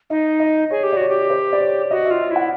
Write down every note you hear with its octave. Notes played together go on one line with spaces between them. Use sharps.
D#4 D#5
D#5
G#4 C#5
G4
D5
F#4 C#5
G4
C5
D5
C#5
F#4 D#5
E5
F4
E5
E4 F#5